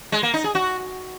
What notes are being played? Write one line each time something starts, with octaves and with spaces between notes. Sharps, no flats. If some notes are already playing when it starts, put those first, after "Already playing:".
G#3
A#3
D#4
G#4
F#4